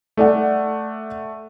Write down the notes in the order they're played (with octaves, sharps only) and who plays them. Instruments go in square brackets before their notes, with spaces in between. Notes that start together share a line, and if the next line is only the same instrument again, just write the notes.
[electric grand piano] A3 [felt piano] A4 D5 F#5